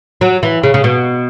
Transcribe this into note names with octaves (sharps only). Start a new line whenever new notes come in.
F#3
E3
C#3
C#3
B2